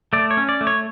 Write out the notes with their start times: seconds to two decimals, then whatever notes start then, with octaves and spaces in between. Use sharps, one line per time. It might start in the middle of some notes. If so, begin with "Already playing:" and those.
0.13 A3 D5
0.31 C#5
0.37 C#4
0.49 D5
0.61 A3
0.67 C#5